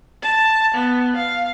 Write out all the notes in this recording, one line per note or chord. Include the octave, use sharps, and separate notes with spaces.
A5
B3
F5